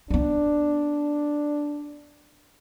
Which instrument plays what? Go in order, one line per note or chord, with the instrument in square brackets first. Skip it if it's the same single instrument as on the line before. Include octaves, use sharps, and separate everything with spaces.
[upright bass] B3 D#4 [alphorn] D4